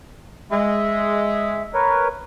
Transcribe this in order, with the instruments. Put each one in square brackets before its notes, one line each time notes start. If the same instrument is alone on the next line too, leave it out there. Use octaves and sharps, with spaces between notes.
[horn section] G#3 [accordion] E5
[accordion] A#4 B4 C#5